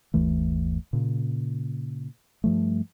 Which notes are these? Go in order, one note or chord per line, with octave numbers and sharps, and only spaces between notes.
G1 D#2 E3 A3
A#2 C#3
G2 F3 A3